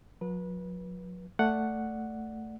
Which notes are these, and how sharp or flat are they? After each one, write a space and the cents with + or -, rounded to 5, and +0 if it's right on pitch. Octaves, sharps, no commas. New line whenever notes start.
F#3 -40 B4 -25
A3 +10 D5 +0 F#5 +0